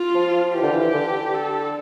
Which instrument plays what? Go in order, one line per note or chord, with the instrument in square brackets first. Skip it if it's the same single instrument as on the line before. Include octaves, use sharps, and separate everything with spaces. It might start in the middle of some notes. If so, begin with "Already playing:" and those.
Already playing: [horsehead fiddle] F4
[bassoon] F3
[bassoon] E3 [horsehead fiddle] G4
[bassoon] D3
E3
D3
[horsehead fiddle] A4